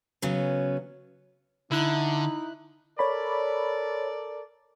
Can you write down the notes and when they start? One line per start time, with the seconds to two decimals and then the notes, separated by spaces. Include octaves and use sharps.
0.22 C#3 F#3 B3 C#4
1.71 D3 D#4 E4 F#6
2.99 A4 A#4 C#5 D5 B5